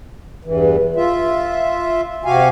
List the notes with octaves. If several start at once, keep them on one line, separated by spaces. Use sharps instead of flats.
E2 G2 E3
F4 E5
C3 F#4 G4 F5 G#5